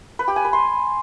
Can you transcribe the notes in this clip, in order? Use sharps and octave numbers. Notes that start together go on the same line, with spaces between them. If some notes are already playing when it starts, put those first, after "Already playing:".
B4
G4
G#5
B4
C6